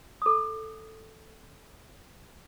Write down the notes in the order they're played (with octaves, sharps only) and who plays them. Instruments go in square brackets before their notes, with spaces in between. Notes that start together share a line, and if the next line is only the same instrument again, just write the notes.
[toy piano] A4 D#6